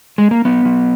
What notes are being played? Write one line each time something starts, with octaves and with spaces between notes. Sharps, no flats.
G#3
A#3
F#3 B3
F#3